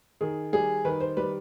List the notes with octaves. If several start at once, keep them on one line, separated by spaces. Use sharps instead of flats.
D#3 G#4
G3 G#4
D#3 B4
C5
G3 B4